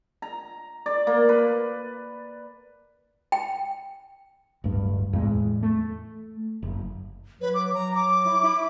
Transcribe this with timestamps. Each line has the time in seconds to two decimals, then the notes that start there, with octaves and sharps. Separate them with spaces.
0.22 A#5
0.86 D5
1.07 A#3
1.29 B4
3.32 G5
4.64 D1 G2
5.13 E2 A2 G#3
5.63 A3
6.62 F#1
7.41 F#3 B4
7.54 D6
7.74 F#3 A#5
7.95 D6
8.26 E4
8.44 E4